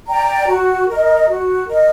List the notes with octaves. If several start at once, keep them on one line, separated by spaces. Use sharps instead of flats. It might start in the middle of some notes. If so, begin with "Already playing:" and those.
D5 G5 A#5
F#4
A#4 D#5
F#4
A#4 D#5